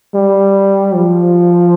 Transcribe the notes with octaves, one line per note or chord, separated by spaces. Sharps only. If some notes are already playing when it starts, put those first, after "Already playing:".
G3
F3